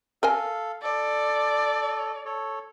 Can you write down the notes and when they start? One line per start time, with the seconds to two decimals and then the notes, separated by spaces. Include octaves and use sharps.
0.23 A4 A#4 D#5 F5 G#5
0.83 A4 D5
2.26 A4 C#5